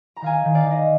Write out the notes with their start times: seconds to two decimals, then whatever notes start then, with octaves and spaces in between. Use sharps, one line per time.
0.16 A#5
0.22 D#3 F5 G#5
0.45 D#3
0.55 D5 F5
0.66 D#3
0.71 D#5